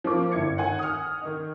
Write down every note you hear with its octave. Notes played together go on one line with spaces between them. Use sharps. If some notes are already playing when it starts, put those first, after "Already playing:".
F3 A#3 D6
G1 E4 G#6 C#7
D#3 F#5 G#5
D#6 F6
D#3 D#4